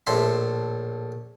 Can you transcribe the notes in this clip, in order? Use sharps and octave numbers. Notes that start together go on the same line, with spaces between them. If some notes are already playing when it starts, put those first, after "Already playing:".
A#1 A2 E5 C6